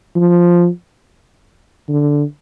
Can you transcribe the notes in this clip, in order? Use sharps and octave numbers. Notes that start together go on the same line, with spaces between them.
F3
D3